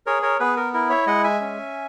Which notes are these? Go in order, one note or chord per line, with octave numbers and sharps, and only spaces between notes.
G#4 A#4 C#5
A#4 C#5
B3 G#4 B4
A#4
E4 A#4
C#5 E5
G#3 D#5 F#5
E5 G#5
C#4